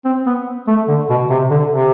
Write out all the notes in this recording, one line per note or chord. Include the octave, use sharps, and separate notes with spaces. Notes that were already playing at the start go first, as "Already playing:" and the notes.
C4
B3
A3
D3
B2
C3
D3
C3